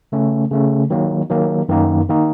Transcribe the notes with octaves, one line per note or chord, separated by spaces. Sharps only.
C#3 A3 C#4
C#3 A3 C#4
D#3 F#3 A#3
D#3 F#3 A#3
F#2 D#3 A#3 D#4
D#3 A#3 D#4